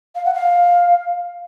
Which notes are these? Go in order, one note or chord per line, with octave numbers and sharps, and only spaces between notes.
F5
F#5
F5